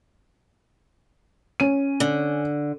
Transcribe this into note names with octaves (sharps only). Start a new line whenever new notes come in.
C#4 D#7
D3